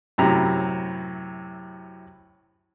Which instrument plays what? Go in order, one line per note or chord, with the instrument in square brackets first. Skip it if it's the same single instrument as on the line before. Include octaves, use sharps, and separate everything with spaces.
[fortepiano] F#2 A2 C3 F#3 A#5 B5